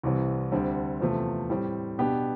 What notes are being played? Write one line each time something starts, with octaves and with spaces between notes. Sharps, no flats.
C2 C3 E3 G3 C4
D2 D3 G3 C4
E2 C3 F3 A3
A2 G3 C4
B2 B3 D4 G4